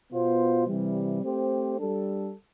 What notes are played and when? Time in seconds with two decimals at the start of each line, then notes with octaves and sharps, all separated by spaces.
0.10 B2 B3 F4 C5
0.66 C3 E3 G3
1.22 A3 C4 G4 C5
1.78 G3 D4 A4